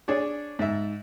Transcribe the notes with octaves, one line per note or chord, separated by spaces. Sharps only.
D4 G#4 C#5 D5
G#2 E5